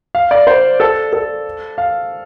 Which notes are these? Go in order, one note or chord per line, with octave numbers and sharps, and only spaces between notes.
F5
D5
C5
A4
A4
F5